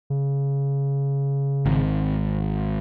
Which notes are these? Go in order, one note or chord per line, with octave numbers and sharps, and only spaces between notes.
C#3
G#1